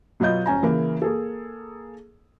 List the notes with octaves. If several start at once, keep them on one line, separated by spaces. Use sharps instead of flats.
B2 F#3 B3 F4 D#5 G6
D#1 C#4 G#5 A#5
C#3 E3 A#3
A#3 G#4 A4